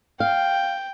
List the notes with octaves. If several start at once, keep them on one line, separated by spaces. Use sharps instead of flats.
F5 G5